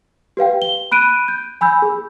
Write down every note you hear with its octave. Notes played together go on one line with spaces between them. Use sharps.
G4 B4 F5 G5
G7
B5 F#6 D7 D#7
G6
G#5 B5 E6 G6
G#4